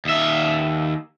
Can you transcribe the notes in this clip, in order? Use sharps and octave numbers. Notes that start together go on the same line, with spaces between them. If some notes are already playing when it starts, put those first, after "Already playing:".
D#2 E5